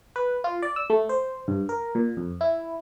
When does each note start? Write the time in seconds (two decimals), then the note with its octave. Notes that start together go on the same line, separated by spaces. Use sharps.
0.16 B4
0.44 F4
0.62 D5
0.76 E6
0.90 A3
1.09 C5
1.48 G2
1.69 A#4
1.95 A#2
2.17 F2
2.41 E4